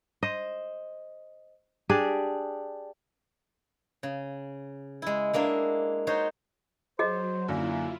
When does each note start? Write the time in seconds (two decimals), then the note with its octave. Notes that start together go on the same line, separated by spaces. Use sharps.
0.23 C5 D#5
1.89 D4 G4 G#4 D5
4.03 C#3
5.02 G#3 E4
5.33 G#3 A#3 D4 E5
6.07 D#4 F#4 C5 C#5
6.99 F#3 G#4 C5 D#5
7.48 F#2 D3 A#3 E4 F4